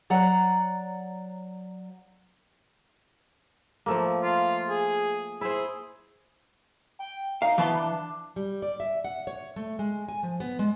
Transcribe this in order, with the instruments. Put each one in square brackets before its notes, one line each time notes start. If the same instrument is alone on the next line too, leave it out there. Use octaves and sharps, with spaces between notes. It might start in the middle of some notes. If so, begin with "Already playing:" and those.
[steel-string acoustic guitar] F#3 D5 F#5 A#5
[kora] F3 A3 A#3
[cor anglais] F4
G#4
[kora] E4 C5 [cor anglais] G#4
[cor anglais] G5
[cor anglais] D#4 [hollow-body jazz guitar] F5
[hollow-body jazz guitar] E3 A5 C6 [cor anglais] B3
[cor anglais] D4
[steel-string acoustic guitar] G3
D5
E5
F#5
C#5
A3
G#3
G#5
F3
B3
G#3